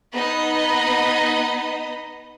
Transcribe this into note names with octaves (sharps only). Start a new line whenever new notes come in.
B3 D#4 D#5 B5